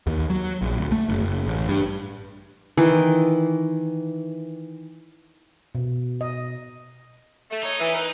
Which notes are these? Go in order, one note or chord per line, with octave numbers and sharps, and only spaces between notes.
D#2
F#3
A#1
D2
A3
F#1
F#1
A1
G2
D#3 E3
B2
D#5
A3
D#4 C#5
E3
B3 A#4 B4